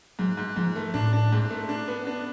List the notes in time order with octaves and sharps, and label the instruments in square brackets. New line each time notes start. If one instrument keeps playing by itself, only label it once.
[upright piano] G#2 [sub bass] F#3
[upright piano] G#2
[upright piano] G#2 [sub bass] F3
[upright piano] A3
[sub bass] A2 [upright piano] D4
[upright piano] D4
G#2
A3
D4
B3
D4